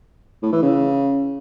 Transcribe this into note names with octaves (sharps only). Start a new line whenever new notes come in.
A2
E3
C#3